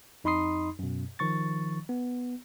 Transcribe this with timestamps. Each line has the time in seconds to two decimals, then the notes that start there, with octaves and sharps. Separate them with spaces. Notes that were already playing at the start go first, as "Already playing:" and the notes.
0.24 F2 D#4 B5 C6 D#6 C7
0.79 F#2 B2
1.19 D#3 F3 C#6 A6
1.89 B3